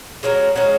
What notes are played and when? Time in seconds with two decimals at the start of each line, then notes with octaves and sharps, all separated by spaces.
0.23 G#3 C#4 F#4 A#4
0.55 G#3 C#4 F#4 A#4